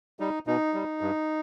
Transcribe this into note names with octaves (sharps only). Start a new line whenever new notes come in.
G3 D#4
B2 D#4
G3
G2